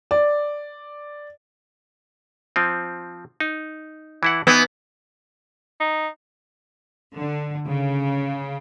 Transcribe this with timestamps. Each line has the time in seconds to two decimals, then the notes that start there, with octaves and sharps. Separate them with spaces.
0.11 D5
2.56 F3 C4
3.40 D#4
4.23 E3 E4 F#5
4.47 E3 B3 D#4 E4
5.81 D#4
7.14 D3
7.66 C#3